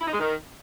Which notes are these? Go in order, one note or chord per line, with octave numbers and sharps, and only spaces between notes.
E4
D#4
G#3
D#3